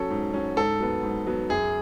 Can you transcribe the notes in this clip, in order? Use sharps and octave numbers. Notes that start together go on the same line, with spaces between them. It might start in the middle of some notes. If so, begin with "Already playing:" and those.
Already playing: F#3 C#4 A4
G#2
F#3 C#4
G#2 A4
F#3 B3
G#2
F#3 B3
F#2 G#4